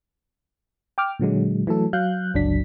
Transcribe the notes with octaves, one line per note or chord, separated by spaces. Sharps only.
G5 D6 F6
A#2 D3 F#3 G#3
E3 F#3 A3 A4
F#3 F5 F#6 G6
G1 C#2 F#3 D4 B6